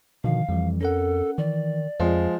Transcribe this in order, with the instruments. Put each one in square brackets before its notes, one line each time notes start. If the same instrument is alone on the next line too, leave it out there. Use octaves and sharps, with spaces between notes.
[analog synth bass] B2 [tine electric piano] D3 D#3 F3 [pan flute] F5
[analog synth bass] F2 [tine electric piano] E3 F3 G3
[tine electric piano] C#4 A#4 F#5 [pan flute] A4
[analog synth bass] D#3 [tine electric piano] E3 [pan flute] D5
[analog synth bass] F2 [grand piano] F3 G#3 [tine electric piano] D#5 C6